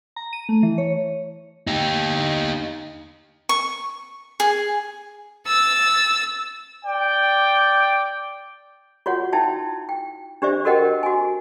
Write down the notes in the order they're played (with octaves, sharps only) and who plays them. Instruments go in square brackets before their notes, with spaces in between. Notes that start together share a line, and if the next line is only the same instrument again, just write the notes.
[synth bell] A#5
D#7
A3
E3
C#5
[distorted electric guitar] D#4 G4
[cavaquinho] C#6
G#4
[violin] E6 A6
[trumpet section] D5 G5
[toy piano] F4 F#4 C#5 F#5
D#4 E4 E5 G5 A5
G5
D4 G4 C5 D5 E5
F#4 A4 A#4 D#5 F#5 G5
F#4 G#5